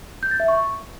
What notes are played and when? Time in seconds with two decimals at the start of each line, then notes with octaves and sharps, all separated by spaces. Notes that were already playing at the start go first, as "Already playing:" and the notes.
0.23 G6
0.31 A6
0.40 E5
0.48 C#6